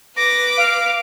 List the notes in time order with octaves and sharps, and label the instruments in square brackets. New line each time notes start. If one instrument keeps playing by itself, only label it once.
[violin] B4 D6 [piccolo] A#6
[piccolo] F5